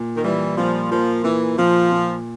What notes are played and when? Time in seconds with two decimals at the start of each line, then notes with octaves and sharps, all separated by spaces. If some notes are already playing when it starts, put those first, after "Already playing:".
Already playing: A#2
0.16 D#3
0.24 E3 G3
0.58 A#2 F3
0.91 F3 A#3
1.24 A#2 E3
1.58 A#2 F3
1.91 A#2